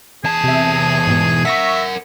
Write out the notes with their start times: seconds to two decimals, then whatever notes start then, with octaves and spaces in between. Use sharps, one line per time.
0.24 E2 G#4 A5
0.44 C3 E5
1.07 G#2 B2
1.45 A#4 E5 F#5 C#6 A#6 B6